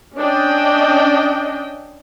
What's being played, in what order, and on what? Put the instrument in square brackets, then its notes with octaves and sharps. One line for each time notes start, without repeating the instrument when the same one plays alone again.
[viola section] C#4 D4 D#5 G5